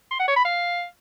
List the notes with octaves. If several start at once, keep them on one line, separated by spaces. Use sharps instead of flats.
C6
F#5
C#5
B5
F5